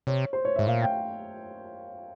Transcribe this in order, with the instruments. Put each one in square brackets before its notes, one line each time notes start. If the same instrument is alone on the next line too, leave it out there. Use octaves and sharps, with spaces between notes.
[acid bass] C3 [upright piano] C#5
[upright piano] C5
C#5
[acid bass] G#2 [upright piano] E5
[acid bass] A#2 [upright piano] F5
[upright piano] G5